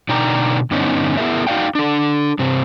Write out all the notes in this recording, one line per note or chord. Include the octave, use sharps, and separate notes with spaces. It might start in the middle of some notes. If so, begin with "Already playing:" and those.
B2 D3 D#4 D5 G5 A#5
G2 D3 B3 C#4 D#4
B3 E4 F4 G#4 A#4 E5
D#4 F#4 D5 F5 G5
D4 A4
G2 C3 C4